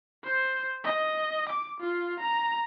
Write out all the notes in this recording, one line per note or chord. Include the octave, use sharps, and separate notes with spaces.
C5
D#5
D6
F4
A#5